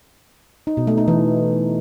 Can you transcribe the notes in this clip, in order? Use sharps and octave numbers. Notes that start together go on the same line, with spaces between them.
D#4
B2
A3
D#4
E3